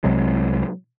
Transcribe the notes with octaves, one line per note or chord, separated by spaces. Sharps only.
C2 C3 F#3 G#3